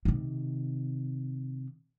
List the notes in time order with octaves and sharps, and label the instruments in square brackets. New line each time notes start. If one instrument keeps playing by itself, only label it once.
[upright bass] C3 D#3